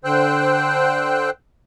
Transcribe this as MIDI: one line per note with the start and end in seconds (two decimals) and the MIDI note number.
0.04 1.30 50
0.04 1.30 72
0.04 1.30 79
0.04 1.30 88
0.04 1.30 90